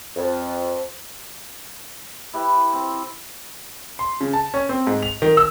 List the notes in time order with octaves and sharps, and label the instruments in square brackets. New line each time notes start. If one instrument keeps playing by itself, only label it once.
[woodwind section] F2
[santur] E4 G4 B4
C4
[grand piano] C6
C#3
A5
C#4
C4
G#2
F7
D#3
E6